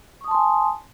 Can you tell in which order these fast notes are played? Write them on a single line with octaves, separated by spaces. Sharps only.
C#6 D#6 A5 C6 G#5